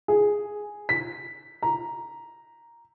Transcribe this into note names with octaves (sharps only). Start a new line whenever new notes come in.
G#4
B6
A#5